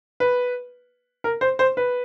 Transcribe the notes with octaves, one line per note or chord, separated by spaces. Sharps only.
B4
A#4
C5
C5
B4